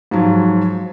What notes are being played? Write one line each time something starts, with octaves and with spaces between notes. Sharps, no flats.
G#2 F3 F#3